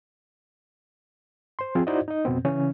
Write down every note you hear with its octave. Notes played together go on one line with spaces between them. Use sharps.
C5 C6
F3 C4 F4 G#4
D#4 E4 F#4 C5 D5 D#5
D#4 D#5
F2 B2 B3 C4
C#3 E3 C#4